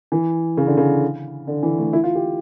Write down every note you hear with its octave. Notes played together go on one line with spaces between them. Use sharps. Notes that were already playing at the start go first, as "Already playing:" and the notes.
E3
C#3
D3
C#3
D3
E3
A3
E4
F4
G4